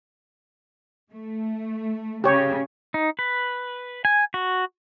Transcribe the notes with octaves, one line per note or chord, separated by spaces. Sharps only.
A3
C#3 G4 C#5
D#4
B4
G#5
F#4